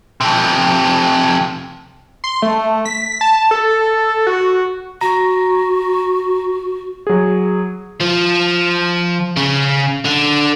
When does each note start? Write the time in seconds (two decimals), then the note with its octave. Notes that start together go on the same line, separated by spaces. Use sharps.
0.21 F2 C3
2.24 C6
2.42 A3
2.85 B6
3.21 A5
3.51 A4
4.27 F#4
5.01 F#4 A#5
7.07 F#3 G#4
8.01 F3
9.37 C#3
10.05 D3